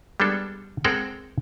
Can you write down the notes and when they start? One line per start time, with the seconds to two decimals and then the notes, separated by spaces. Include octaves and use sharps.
0.20 G3 G#3 B3 D4 A4
0.85 G#3 C4 A4 A#4 F#5 G5